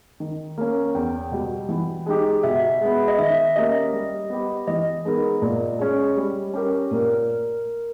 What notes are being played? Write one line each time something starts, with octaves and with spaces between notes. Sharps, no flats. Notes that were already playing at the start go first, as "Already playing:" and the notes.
D#3
A#3 C#4
E2 G5
B2 G3
E3
G#3 D#4 G4
B2 E5
G#3 B3
D#5
D#3 E5
A#3 C#4 G4 D#5
G3
B3 G4
E3 D#5
G#3 B3 D#4 A#4
A#2
G#3 C#4
G3
C#4 G4 A#4
A#2 A#4